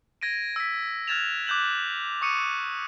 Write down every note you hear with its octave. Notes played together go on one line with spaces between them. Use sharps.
G#6 A#6 D7 D#7
E6 B6
F6 F#6 G#6 A6 E7 F7
D6 F#6 G6 E7 F#7
C#6 D#6 C#7 D#7 E7